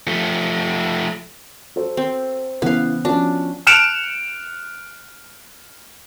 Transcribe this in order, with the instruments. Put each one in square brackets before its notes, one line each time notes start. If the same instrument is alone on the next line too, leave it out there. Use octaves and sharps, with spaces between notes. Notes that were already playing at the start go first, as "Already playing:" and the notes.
[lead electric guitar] F3 A3
[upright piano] F#4 A4 C5
[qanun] C4
[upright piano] C#3 E3 [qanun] B3 F5
[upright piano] F3 C#4 F#4 [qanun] D4
[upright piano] F6 F#6 C#7 D7 E7 F7